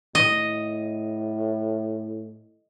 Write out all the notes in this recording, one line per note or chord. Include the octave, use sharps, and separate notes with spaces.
A2 D#5